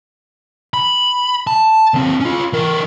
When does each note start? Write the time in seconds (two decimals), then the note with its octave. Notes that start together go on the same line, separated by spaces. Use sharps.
0.74 B5
1.47 A5
1.94 D#2 C4
2.21 C#4 F4
2.53 E3 A#4